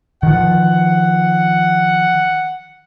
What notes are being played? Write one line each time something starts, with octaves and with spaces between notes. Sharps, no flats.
D#3 F3 F#5